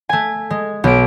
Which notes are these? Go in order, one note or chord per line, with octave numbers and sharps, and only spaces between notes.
A3 G#5
G#3
B1 D7